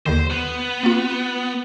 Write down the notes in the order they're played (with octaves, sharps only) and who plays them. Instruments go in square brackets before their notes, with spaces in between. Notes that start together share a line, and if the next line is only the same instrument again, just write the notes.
[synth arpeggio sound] D#2 D3 D#3 [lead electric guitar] C5
[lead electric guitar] B3
[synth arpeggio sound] A#3 C4 F4